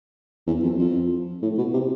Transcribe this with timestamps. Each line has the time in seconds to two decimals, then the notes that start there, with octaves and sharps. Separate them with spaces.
0.47 E2
0.63 F2
0.79 F2
1.42 A2
1.58 B2
1.73 C3